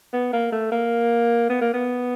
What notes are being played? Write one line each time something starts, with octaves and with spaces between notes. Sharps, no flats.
B3
A#3
A3
A#3
B3
A#3
B3